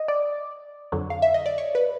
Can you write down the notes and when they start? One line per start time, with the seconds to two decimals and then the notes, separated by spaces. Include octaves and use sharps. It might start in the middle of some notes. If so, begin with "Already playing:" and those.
Already playing: D#5
0.08 D5
0.92 F2 D3 F#3
1.10 F5
1.22 E5
1.34 D#5
1.46 D5
1.58 C#5
1.75 B4